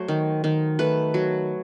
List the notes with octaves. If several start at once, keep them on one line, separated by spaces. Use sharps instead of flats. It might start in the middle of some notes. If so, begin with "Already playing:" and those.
Already playing: F#3 A3 C5
D#3
D#3
A3 B4
F#3